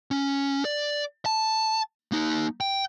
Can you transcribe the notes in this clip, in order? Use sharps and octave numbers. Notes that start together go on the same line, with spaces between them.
C#4
D5
A5
A#3 D#4
G5